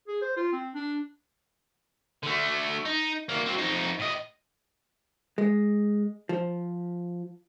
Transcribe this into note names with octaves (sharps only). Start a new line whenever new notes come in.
G#4
C5
F4
C4
D4
D3 A3
D#4
D2 A#3
F#3 C4
F2 D#4
A2 D#5
G#3
F3